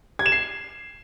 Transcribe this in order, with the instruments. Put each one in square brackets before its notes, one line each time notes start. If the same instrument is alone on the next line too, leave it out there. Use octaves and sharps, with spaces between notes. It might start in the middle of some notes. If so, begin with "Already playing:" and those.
[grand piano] G#6
E7
C7